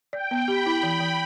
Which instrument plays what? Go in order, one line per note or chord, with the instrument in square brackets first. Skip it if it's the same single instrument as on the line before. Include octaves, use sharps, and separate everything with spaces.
[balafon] D5 [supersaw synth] G5
[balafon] B3
[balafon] G4 [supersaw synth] B5
[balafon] E4
E3
E3